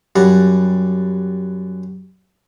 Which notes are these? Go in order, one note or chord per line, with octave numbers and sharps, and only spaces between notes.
F#2 G3 F#5